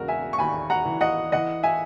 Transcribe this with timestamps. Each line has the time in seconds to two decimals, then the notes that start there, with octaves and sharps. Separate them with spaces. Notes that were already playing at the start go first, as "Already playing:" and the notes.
Already playing: E1 C#3 F#4 A#4
0.08 E5 G#5
0.33 C#6
0.39 D#2 G#5 B5
0.70 F#5 A#5
0.85 E3
1.01 D#5 F#5
1.32 E3 D#5 F#5
1.63 E5 G#5